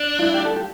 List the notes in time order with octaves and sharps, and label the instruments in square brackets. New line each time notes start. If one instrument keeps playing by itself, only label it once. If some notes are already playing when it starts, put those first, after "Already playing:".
Already playing: [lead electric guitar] D4
[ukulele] F4
E4
G4
A4
G4